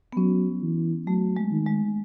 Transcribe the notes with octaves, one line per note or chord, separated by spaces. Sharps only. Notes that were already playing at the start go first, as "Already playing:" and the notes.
B3
F#3 C#4
E3
F#3 A3
G#3
D#3
G#3